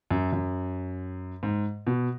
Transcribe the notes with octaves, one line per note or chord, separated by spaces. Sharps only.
F#2
F#2
G#2
B2